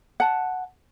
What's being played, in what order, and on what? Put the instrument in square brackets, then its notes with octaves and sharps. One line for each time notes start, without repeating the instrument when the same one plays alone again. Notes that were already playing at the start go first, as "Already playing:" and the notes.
[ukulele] F#5 A5